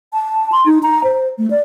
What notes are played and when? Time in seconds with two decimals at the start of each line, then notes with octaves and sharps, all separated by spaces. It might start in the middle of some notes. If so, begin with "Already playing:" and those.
0.13 A5
0.52 C6
0.66 D#4
0.83 A#5
1.04 C5
1.38 A3
1.51 D5